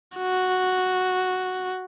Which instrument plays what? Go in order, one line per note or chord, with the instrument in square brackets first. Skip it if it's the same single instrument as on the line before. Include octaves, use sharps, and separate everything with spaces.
[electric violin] F#4